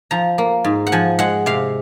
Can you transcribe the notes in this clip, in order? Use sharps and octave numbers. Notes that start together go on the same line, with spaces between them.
F3 A#5
A#3
G#2
F#5
F3 G#5
G#3 F#5
C3 F5